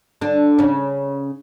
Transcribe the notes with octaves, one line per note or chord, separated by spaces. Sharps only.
D3 D4
C#3 C#4